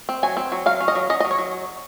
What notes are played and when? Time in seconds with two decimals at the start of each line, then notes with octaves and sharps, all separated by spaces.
0.09 C4
0.23 F#3 G#5
0.37 C4
0.52 F#3
0.66 F#3 F5
0.80 C#4
0.88 D#5
0.95 F#3
1.10 C#4 D#5
1.20 D#5
1.25 F#3
1.31 C#5
1.38 F#3